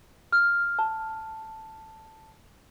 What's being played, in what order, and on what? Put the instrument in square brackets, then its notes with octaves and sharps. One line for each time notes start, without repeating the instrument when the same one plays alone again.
[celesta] F6
A5